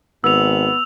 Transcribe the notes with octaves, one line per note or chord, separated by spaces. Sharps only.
G#1 B3 E6 F7